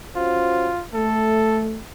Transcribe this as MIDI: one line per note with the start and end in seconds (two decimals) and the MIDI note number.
0.16 0.69 61
0.16 0.83 65
0.16 0.69 66
0.16 0.69 72
0.94 1.76 57
0.94 1.61 69